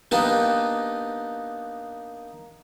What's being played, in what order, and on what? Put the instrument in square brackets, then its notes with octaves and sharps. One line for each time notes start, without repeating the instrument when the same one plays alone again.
[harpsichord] A#3 B3 D4 D#4 G4 B4